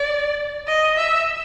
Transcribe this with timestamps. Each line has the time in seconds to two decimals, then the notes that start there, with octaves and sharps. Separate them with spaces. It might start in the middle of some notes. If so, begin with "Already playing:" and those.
Already playing: D5
0.68 D#5
0.97 E5